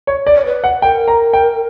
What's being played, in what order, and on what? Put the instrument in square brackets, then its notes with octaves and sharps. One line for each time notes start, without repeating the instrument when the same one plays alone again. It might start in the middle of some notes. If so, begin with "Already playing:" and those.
[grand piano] C#5
D5
[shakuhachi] C#5
B4
[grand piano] F#5
[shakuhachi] A#4 [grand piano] G5
[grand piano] A#5
G5